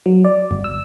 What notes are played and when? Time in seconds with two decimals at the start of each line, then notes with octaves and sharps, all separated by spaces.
0.06 F#3
0.25 D5
0.51 G1
0.64 E6